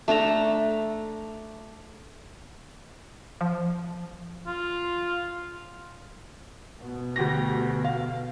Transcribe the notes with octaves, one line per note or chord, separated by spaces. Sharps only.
A3 D4 A4 A#5
F3
F4
B2 B3
D2 G4 A#6
F5